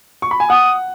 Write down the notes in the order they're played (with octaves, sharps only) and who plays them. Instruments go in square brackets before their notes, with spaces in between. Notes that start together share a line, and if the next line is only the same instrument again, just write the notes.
[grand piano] C#6
B5
G#5
[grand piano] F#5 [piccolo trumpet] D#6